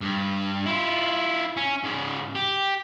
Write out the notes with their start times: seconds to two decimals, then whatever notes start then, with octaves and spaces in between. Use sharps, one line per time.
0.01 G2
0.66 E4 F4
1.57 C#4
1.84 G#2 C#3
2.35 G4